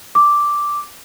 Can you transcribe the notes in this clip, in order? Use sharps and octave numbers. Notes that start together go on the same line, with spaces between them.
D6